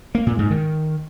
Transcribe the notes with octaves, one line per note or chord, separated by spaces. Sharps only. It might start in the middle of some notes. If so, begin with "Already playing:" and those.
A#3
A#2
G#2
D#3